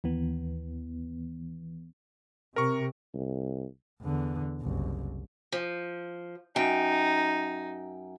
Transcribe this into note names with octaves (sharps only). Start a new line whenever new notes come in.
D#2 E3 B3
C3 A#4 C#6
C2
E2 D3
F#1 C2
F3
F#2 D#4 G5